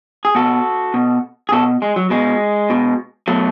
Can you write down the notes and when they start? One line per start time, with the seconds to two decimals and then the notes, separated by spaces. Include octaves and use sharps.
0.25 G#4
0.35 B2 F#4 A4
0.94 B2
1.49 G#4
1.52 B2 F#4 A4
1.82 G#3
1.96 F#3
2.10 B2 G#3
2.70 B2
3.28 B2 F#3 A3